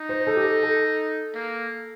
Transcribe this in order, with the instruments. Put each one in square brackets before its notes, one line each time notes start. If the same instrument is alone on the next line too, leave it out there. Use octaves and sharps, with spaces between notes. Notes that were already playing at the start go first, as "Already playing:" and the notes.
Already playing: [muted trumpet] D#4
[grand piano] C5
A4
G4
A4
A4
[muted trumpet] A#3